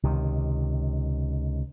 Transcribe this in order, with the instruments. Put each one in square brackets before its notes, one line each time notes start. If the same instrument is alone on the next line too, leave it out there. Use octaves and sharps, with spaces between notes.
[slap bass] C#2 C3 D#3